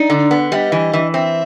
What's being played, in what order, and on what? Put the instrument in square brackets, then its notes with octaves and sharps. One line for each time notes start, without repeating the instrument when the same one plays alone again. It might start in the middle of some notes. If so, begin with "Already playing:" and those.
Already playing: [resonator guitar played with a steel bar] D#4 [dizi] D5
[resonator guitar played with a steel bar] D3
B3
[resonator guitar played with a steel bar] G3 [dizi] E5
[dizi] D#5
[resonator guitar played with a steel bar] E3
E3
[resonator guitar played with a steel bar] C4 [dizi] E5